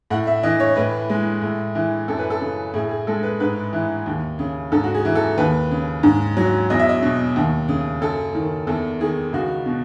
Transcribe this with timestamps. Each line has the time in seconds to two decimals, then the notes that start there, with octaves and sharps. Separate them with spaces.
0.10 A2 F#5
0.27 E5
0.43 E3 D#5
0.60 C#5
0.76 A2 B4
1.10 G#3
1.42 A2
1.75 E3
2.08 F#2 A4
2.19 B4
2.30 A4
2.41 C#3
2.74 A2 G#4
2.91 G#4
3.07 G#3 A4
3.23 B4
3.40 G#2 B4
3.73 E3
4.06 D#2
4.39 C#3
4.72 G#2 A4
4.84 F#4
4.95 G#4
5.05 E3
5.15 A4
5.38 D#2 B4
5.71 C#3
6.03 G#2
6.37 F#3
6.70 E2 D#5
6.79 E5
6.89 D#5
7.03 B2
7.36 D#2
7.68 C#3
8.01 F#2 A4
8.35 D#3
8.67 E2 A4
9.00 D#3 G#4
9.33 C#2 F#4
9.66 B2